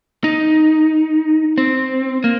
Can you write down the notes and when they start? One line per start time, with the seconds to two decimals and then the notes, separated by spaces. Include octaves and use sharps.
0.24 D#4
1.58 C4
2.24 A#3